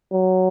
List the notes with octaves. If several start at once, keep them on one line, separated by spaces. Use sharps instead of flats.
F#3